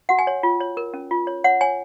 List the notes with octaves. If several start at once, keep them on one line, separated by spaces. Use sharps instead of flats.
F#4 F#5
G#5
C#5
F4
C#5
A#4
C#4
F4
C#5
C#5 F#5
C#5 G#5